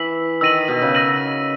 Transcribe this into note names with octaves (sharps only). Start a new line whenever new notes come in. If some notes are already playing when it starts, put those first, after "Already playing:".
Already playing: E3 E6 B6 F#7
D#3 E6 A#6 D#7 F#7
B2
C#3
E6 A#6 D#7 F#7